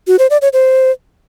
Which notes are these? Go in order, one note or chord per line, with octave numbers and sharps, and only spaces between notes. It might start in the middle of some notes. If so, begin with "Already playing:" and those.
F#4
C5
D5
C#5
C5